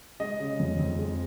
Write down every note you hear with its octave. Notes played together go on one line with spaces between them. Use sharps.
G#3 D#5
C#3
F2
F2
G#3